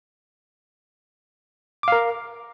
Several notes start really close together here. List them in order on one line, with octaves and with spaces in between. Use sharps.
D6 F5 A#4